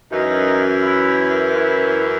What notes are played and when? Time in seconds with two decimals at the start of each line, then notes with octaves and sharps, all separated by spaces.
0.12 F#2 E3 D#4
0.84 E4
1.56 E4